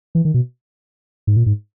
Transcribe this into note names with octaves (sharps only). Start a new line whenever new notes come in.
E3
D#3
B2
G#2
A#2
G#2